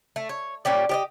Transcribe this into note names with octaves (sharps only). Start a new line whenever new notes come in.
A3
C#5
A#2 C#4 G4 D5
G4 D5 D#5